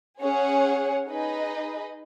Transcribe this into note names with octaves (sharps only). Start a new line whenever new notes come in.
C#4 G#4 C#5 F#5
D#4 G#4 B4 D#5